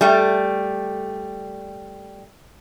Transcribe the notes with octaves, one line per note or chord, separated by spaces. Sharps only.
G3 A3